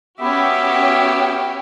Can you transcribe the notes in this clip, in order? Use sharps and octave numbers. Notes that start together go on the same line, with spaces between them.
B3 C#4 F#4 G4 E5 D6